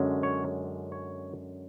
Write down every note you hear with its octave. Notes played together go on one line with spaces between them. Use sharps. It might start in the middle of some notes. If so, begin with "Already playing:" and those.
Already playing: F#2 D3 G#3 C#4
C#5
C#5